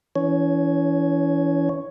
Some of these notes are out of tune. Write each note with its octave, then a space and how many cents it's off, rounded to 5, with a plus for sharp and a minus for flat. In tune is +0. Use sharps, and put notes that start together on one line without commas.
E3 +0 C#4 +35 C#5 +0